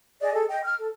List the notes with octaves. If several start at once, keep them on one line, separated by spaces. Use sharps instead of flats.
G#4 D5 D#5
G#4 A4
D#5 G5
F6
A4